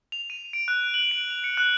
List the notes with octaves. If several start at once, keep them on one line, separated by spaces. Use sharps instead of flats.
F7
D#7
D7
F#6
F#7
D7
F7
C#7
F#6